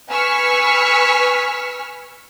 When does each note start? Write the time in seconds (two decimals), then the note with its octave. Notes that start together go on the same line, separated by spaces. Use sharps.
0.11 B4 G#5 C#6 E6 F6 B6